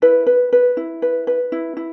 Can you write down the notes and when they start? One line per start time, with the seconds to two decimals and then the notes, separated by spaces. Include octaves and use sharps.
0.02 E4 B4
0.26 B4
0.53 B4
0.77 E4
1.02 B4
1.27 B4
1.52 E4
1.77 E4